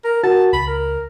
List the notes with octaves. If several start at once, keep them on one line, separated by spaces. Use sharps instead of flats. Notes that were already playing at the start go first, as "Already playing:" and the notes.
A#4
F#4 A#4 A5
C#2 B5
A#4